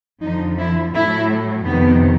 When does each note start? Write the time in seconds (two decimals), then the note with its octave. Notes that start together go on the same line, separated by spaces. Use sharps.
0.22 F2 D3 F3 D#4
0.58 E4
0.93 A2 F#3 E4
1.64 F2 C3 D#3 B3